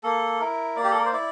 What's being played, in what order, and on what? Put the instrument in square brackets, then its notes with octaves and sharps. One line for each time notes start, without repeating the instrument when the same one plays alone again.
[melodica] A#3 A4
E4 A#4
A#3 D5
G4
A4
A#4
C5
E4 D5